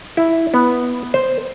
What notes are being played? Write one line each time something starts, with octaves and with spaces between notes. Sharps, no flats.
E4
B3
C5